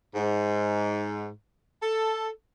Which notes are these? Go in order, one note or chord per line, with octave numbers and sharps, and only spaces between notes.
G#2
A4